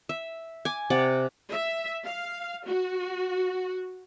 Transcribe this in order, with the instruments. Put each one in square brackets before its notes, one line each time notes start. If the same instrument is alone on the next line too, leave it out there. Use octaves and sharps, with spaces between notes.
[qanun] E5
G#5 D6
C3 D5 F#5
[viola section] E5
F5
F#4